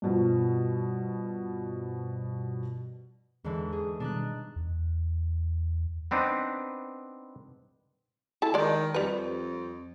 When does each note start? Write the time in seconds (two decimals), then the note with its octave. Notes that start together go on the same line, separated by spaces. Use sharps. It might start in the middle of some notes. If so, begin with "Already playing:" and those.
0.02 G2 B2 F3
3.44 E2 G#2 D3 E3
3.72 G#4
4.00 B2 D#3 G3 D4 D#4 F#6
4.56 E2
6.11 B3 C4 D4 D#4 B4
8.42 E4 A4 A5
8.54 D#3 G#3 D5
8.94 F2 G3 B4